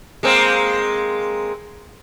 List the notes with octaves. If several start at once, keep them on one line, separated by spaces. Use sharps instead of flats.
G#3 A#3 C4